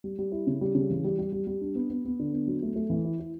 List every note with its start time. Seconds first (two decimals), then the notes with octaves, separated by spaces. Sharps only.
0.04 G3
0.19 G3
0.32 E4
0.47 C#3
0.61 G3
0.75 C#3
0.90 E3
1.04 G3
1.19 G3
1.32 G3
1.47 G3
1.61 D4
1.75 B3
1.90 B3
2.05 B3
2.19 D3
2.33 B3
2.47 F#3
2.62 A3
2.76 A3
2.90 E3
3.04 E4
3.19 E4